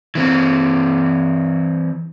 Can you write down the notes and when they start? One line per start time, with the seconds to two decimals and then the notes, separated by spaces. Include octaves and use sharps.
0.15 E3 C4